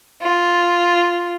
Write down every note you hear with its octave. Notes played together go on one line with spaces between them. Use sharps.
F4